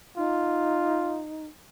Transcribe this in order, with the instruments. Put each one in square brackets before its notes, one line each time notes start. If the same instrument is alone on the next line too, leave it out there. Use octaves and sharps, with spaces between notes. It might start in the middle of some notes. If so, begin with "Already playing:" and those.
[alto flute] D#4 [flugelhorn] F4